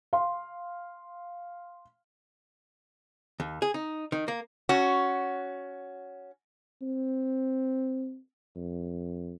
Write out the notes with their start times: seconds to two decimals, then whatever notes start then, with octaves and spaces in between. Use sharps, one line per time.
0.13 F5 C6
3.40 D#2
3.62 G#4
3.74 D#4
4.12 D#3
4.28 A#3
4.69 C#4 F#4
6.82 C4
8.56 F2